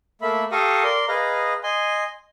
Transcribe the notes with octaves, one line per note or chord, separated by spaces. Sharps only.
A3 A#3 E5 B5
G4 A4 F5 A#5 C#6 D#6
A#4 D5 C6
G#4 B4 D#5 F5 A#5
D#5 G#5 C6